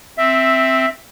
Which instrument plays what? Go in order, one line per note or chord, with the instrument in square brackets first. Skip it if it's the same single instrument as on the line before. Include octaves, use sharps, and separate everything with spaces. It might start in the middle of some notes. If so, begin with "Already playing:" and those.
[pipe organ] C4 [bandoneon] E5